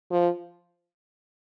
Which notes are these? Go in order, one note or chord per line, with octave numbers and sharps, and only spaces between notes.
F3